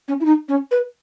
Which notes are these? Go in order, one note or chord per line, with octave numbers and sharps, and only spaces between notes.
C#4
E4
D#4
C#4
B4